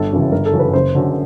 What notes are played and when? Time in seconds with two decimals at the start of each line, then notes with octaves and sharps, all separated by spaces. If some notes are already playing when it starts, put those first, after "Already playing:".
Already playing: G1 A4
0.12 F#2 C#3 E3
0.32 G1 A#4
0.46 A4
0.53 F#2 C#3 E3
0.59 B4
0.73 F#1 C5
0.95 F#2 D3